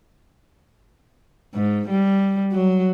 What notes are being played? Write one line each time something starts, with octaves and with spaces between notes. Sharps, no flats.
G#2
G3
F#3